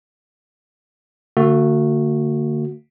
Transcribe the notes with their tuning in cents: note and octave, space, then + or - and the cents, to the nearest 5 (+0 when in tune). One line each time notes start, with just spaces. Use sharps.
D3 +0 A3 +45 F#4 -15